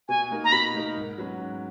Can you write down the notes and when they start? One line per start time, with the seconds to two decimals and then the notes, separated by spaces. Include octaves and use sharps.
0.08 B2 G#5
0.31 A#3 D#4 A#4
0.44 A#5
0.52 B2 B5
0.75 A#3 D#4 A#4
0.97 G#2
1.18 F#3 C#4 F#4 B4
1.40 G#2